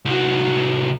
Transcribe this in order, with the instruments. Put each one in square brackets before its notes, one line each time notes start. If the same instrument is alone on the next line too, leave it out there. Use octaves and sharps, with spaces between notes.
[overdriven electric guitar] C2 F#3